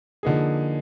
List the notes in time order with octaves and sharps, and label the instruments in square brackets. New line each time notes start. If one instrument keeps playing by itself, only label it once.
[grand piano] D3 F3 A#3 D#4 G#4